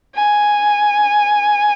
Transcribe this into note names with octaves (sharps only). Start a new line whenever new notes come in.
G#5